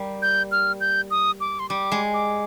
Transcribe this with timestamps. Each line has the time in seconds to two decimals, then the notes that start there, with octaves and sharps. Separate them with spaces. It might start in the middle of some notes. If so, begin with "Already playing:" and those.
Already playing: G3 A#3
0.22 G6
0.52 F6
0.81 G6
1.11 D#6
1.41 D6
1.59 C6
1.69 G3 D6
1.92 G#3
2.14 D6